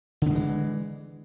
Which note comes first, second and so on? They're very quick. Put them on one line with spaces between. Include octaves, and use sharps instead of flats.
D3 B3 G#3 E3